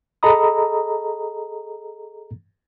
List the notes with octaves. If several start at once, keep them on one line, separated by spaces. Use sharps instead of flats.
G#4 A4 D#5 A#5 B5 D#6